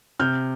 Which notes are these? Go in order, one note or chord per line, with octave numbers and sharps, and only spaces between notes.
C3 F6 G6